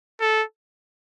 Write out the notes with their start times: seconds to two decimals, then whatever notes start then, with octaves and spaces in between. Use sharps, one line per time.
0.21 A4